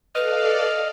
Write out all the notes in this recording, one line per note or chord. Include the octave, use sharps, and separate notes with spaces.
A4 B4 D5 D#5 F5 F6